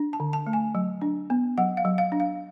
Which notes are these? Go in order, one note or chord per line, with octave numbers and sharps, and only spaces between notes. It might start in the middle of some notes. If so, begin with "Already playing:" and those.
Already playing: D4
A5
D3
A5
A3
G#5
F#3
D4
B3
F#3 F#5
F5
F#3
F5
D4
F5